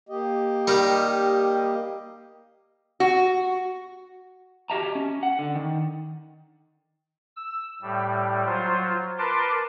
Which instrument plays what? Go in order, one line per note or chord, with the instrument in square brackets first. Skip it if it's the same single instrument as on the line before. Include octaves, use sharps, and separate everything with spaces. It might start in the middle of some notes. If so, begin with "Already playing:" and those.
[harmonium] A#3 G4 D#5
[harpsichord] D#3 G3 D#4
[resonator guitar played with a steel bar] F#4
[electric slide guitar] F#4 G4 D#5 E5 A5 A#5
C#4
F#5
D3
D#3
[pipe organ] E6
A2 G3
F#3 F4 C5
A#4 B4 A5 C6 D6